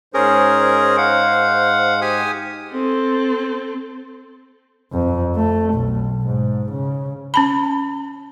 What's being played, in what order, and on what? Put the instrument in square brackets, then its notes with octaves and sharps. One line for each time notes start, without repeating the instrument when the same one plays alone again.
[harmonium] G#2 C5 [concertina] C#4 G#4 A#4
[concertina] F5 F#5
G4 G#5 D#6
[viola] C4 A4
[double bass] F2
A3
B1
G#2
C#3
[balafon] C#4 A5 B5